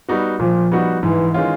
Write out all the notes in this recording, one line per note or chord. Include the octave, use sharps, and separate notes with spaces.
G3 B3 D#4 F#4
A#2 F3
G3 B3 D#4 F#4
G#2 E3
D#3 G#3 C#4 F4